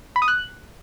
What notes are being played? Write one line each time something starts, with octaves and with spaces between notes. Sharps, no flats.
B5
D#6
F#6